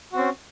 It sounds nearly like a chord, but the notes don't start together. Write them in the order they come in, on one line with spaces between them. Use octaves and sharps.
F#4 C4 C#4